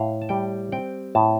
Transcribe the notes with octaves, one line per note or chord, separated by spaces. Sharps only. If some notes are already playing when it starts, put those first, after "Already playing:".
Already playing: A2 F5
A5
G3 G5
C4 G5
A2 A5